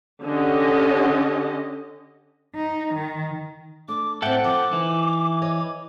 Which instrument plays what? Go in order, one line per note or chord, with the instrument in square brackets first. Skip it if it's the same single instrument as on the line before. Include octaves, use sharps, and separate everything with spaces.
[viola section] D3 C#4 G4 D#5
[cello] D#4
D#3
[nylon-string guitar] A3 D4 [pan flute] D6
[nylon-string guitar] A2 C4 [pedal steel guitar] A4 F#5 G5 [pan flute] E5
[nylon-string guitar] F3 [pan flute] D6
[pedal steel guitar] E3 [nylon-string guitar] D#4
[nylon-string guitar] C#5 D#5